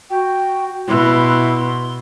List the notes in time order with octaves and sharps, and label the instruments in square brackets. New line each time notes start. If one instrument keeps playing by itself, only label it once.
[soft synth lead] F#4 [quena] G5
[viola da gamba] B2 [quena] E4 [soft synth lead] C6